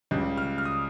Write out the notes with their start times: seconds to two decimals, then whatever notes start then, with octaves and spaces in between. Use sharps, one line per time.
0.11 C#2 C#3 G3
0.37 F6
0.58 F6
0.65 D#6